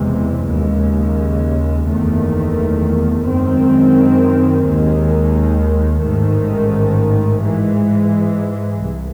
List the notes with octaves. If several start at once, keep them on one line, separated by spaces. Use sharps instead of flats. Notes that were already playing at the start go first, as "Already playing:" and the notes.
Already playing: F#1 E2 C3 E3 G#3
D#2 C#3 G#3
F#1 E2 D#3 A3
F#2 D#3 G#3 C4
D#2 D#3 G#3
A1 G#2 D#3 A3
G#2 E3 G#3
C2